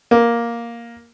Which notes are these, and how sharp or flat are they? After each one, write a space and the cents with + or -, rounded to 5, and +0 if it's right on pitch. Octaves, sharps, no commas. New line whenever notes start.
A#3 +5